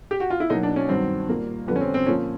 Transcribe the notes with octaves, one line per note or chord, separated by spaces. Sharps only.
G4
F#4
F4
E4
B2 F#3 A#3 D#4
D4
C#4
G2 D#3 F#3 C4
A#2 G3 A#3
F2 D3 G3 B3
C#4
C4
C4
A#2 F3 A#3 C#4